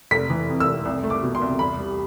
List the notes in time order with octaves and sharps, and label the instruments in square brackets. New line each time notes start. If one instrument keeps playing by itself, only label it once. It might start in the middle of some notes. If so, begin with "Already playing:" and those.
[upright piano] F1 B6
E3
F2
E6
F1
C2
A3
D6
B2
C6
C2
E2 B5
G3